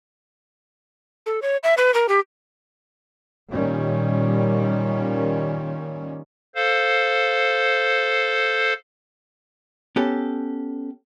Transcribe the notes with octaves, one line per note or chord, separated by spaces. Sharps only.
A4
C#5
E5
B4
A#4
G4
A#2 D#3 G3 C#4
A4 C5 F5
B3 C#4 G4 A4